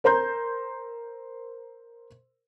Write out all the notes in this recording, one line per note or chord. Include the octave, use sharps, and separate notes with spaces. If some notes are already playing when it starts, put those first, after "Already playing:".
A#4 C5 A#5 C6 G6